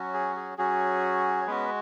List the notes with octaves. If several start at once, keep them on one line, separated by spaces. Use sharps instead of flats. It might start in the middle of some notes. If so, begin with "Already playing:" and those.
Already playing: F#3 C#4 F#4
G#4
G#4
F#3 C#4 F#4 G#4
C#5
G#3 B3 C#4 F#4 B4